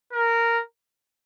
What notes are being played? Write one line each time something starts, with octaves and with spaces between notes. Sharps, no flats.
A#4